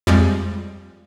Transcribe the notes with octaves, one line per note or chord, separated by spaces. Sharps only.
F2 G3 G#3